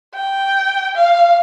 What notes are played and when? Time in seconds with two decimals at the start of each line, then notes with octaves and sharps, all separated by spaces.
0.15 G5
0.96 F5